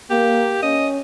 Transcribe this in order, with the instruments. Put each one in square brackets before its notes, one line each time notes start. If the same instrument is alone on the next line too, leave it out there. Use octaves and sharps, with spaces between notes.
[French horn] A#3 [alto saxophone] G4
[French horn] C#4 [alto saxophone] D#5